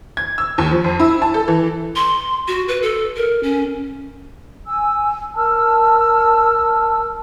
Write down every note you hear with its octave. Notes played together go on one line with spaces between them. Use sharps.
G#6
E6
D#2
F3
F2
E4
A5
A4
E3
C6
F#4
B4
A4
A#4
C#4
G#5 E6
A#4 A5 E6 F6